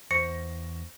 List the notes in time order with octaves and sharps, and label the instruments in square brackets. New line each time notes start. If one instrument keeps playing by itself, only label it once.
[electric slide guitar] E2 [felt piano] C5 C#6 A#6 [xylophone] C#7